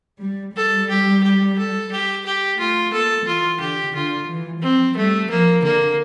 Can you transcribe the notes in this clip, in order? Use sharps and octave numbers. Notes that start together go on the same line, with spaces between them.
G3
G3 A4
G4
G4
A4
G4
G4
A3 F4
A#3 A4
E3 F4
D3 G4
D3 F4
E3
F3 C4
G3 A3
F3 A#3
D3 A#3